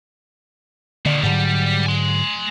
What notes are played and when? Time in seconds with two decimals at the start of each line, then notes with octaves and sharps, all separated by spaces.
1.06 A#2 D3 D#3
1.23 G#2 D3 F#3 G3
1.86 G#5 C6